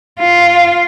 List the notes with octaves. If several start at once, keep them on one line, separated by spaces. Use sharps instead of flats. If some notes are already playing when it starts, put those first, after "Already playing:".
F4